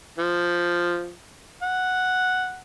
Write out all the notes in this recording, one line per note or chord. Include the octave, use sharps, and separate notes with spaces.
F3
F#5